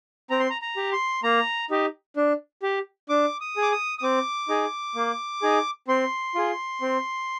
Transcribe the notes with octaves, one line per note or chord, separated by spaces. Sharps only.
C4 A#5
C6
A#5
A#5
G4
C6
A#3 A#5
D#4 G4
D4
G4
D4 D6
D#6
G#4
D6
D#6
D#6
C4 D6
D#4 G#4
A#3
D#4 G#4
C4 C6
F4 G#4
C4